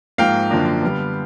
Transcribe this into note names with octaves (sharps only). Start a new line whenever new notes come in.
G#2 F3 A#3 F5 G5
F#2 D3 F3 A#3 D4
D3 G3 B3